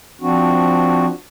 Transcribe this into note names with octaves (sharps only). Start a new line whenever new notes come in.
F3 C4 D4 F#4